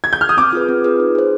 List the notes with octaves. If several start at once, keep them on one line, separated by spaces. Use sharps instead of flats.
G#6
G6
F6
D#6
C4 D6
F4 G#4 B4
C4
F4 G#4 B4
D#4
G#4 C5